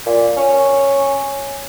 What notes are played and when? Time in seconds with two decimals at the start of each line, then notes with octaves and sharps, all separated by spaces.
0.06 A#2
0.37 C#4